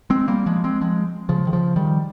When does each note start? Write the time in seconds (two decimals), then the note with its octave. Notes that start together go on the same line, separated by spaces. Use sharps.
0.10 G#3 C4
0.28 G3 A#3
0.46 F3 G#3
0.64 G#3 C4
0.81 F3 G#3
1.29 C#3 F3
1.47 D#3
1.53 C#3 F3
1.76 D#3 G3